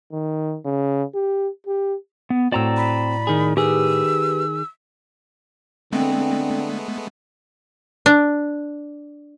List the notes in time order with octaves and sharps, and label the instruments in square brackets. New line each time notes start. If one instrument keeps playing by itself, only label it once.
[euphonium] D#3
C#3
G4
G4
[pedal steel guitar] B3
[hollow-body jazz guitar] A2 F#4 [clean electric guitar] C4 [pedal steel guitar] D5 A#5 E6
[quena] B5
[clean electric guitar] D#3 G#4
[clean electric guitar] D#3 G#4 [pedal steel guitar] G4 B4 [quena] E6
[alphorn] D3 [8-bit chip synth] G#3 A3 B3 [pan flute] C4
[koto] D4